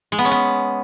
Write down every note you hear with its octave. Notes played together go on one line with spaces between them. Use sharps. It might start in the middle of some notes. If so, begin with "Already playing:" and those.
G#3
B3
C#4
B3